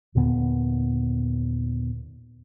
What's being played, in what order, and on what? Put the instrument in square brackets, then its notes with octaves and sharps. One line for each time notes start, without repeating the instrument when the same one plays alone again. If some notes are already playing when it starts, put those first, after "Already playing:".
[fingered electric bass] D#2 A#2 D3 B3